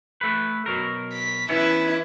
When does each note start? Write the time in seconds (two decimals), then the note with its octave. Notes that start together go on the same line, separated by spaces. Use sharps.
0.21 A3 B4
0.66 B2 F#3 A#4
1.13 B6
1.49 E3 B3 C#4 E4 B4